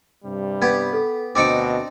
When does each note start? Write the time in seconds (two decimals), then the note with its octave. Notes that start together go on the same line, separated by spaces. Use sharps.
0.25 G2 C3 G3
0.62 B3 G4 G#6
0.93 A4
1.35 D2 B2 C4 D4 D#4 D6 C#7 D7